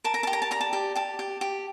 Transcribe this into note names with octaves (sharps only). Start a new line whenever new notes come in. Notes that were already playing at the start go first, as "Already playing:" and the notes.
A#4 A5
A#5
G4 A5
A#5
A5
D5 A#5
A5
G4
G4 A5
G4
G4